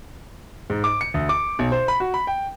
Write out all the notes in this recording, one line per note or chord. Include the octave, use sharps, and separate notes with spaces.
G#2
D6
C#7
D2
D6
B1
C5
B5
F#4
B5
G5